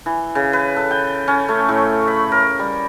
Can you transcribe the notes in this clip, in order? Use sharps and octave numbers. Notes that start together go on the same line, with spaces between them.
E3
C#3
B4
A4
G5
C#4
A3
A2
B5
A#4
G3